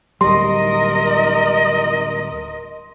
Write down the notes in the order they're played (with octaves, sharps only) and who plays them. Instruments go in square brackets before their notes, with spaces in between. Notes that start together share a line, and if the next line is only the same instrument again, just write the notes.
[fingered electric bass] D1 G3 [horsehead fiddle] A#4 D#5 [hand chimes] C6